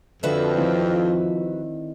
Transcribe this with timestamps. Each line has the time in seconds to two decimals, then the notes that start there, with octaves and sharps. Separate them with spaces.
0.23 F2 D3 F#4 B4 E5
0.56 D#3 F3 C4 E4